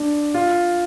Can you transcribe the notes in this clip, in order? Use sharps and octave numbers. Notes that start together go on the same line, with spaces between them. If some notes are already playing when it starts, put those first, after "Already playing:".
Already playing: D4
F4